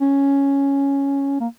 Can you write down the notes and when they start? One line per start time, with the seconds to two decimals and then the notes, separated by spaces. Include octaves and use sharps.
0.01 C#4
1.40 A#3